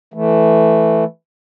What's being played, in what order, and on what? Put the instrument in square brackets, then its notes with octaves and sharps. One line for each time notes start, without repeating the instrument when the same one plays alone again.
[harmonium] E3 A3